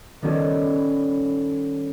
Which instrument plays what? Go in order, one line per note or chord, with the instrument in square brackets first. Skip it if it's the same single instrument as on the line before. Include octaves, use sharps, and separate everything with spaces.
[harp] D#3 G3 B3 C#4 G4 A4